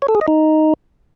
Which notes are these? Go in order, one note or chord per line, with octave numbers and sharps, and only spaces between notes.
C#5
A4
G#4
D#5
D#4